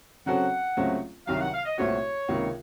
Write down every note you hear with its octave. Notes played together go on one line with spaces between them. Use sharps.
C#3 F#3 C4 F#4 A4 F#5
C#2 C#3 F#3 A3 C4
C2 C3 D#3 F#3 F5
F#5
F5
D#5
C2 A#2 A3 C4 F#4 C#5
C#2 C3 D#3 A#3